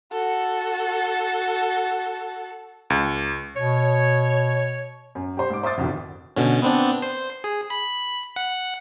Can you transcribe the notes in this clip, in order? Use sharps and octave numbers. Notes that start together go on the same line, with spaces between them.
F#4 A4
C#2
B2 C#5
F#2
G4 C5
G#2 D6
C5 E5 D6 D#6 A6
F1 C2 B2 D3 D#3
B2 D3 C#4
B3 C4 D4
C5
G#4
B5
F#5